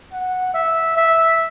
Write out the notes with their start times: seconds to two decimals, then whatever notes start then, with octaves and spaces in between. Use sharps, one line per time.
0.12 F#5
0.54 E5
0.97 E5